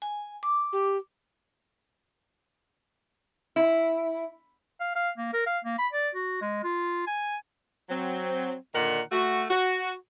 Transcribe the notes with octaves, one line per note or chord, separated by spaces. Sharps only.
G#5
D6
G4
E4
F5
F5
A#3
A#4
F5
A#3
B5
D5
F#4
G#3
F4
G#5
F#3 C4
A#2 D3 D#3 A#4 F#5
A3 F#4
F#4